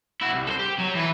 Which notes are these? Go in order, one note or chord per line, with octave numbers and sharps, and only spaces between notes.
E4 F#4
C2
A4 C5
G4
F#3
E3 B4